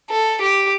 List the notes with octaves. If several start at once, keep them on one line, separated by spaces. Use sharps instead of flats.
A4
G4